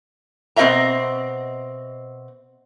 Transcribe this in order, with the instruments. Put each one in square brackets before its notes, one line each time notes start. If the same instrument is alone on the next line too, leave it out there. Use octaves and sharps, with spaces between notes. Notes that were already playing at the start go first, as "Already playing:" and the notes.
[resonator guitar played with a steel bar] B2 C4 A#4 D#5 E5 A#5